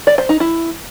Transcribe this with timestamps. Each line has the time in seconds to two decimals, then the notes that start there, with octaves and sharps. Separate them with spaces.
0.07 D5
0.18 C5
0.29 D#4
0.40 E4